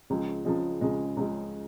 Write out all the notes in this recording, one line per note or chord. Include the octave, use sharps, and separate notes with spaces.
C#2 C#3 F3 G#3
C#2 C#3 F3 G#3
C#2 C#3 F3 G#3
C#2 C#3 F3 G#3